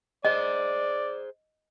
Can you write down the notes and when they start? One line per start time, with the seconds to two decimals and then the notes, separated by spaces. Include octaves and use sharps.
0.25 G#4 C5 D5 D#5